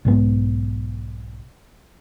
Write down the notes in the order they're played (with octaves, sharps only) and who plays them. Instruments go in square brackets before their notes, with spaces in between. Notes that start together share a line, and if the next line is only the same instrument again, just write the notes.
[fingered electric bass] B1 G#2 B3